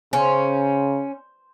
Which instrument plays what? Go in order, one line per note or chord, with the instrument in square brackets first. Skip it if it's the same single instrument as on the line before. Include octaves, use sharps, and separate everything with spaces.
[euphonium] C#3 [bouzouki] C#4 [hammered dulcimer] C5